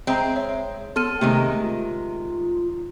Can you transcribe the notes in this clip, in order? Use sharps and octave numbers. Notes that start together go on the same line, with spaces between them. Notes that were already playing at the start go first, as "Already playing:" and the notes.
G#3 C4 C5 E5 A#5
C#5 E5
B3 A4 C6 F6 D#7
C3 D#3 G#3 A3 G4
F4